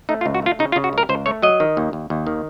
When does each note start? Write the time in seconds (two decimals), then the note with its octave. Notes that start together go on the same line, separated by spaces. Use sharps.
0.09 A3 D#4
0.21 F4
0.26 C#2
0.34 F#4
0.42 A3 F4
0.59 C#3 D#4
0.72 F4
0.76 C#3
0.84 F#4
0.93 C#2 A#4
1.09 C#2 C5
1.26 A3 C#5
1.42 F#3 D#5
1.60 D#3
1.77 D#2
1.93 D#2
2.10 D#2
2.27 D#3